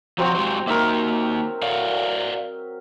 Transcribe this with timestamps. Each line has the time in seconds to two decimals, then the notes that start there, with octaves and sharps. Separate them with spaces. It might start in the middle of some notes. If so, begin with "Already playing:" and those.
0.18 F3 F#3 C4 F#4 A#5
0.35 G#3 G4 C5
0.67 A#3 D#4 A#4 E5
1.62 C#5 D5 F5